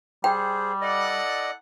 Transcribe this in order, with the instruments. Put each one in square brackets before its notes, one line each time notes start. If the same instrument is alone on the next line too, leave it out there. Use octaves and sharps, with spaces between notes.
[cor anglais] G3 [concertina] G#4 C5 [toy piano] G5
[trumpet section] E4 A4 F#5 [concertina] D5 D#5